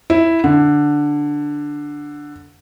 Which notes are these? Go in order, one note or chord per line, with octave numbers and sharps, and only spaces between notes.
E4
D3